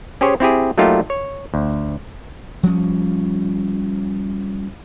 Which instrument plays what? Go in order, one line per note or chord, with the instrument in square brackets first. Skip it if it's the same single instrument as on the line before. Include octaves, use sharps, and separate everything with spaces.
[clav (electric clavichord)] C#4 G4 G#4 C5 C#5
C4 E4 G4 G#4
F#3 A3 A#3 D#4 F4 G4
C#5
D2
[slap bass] F3 G3 C#4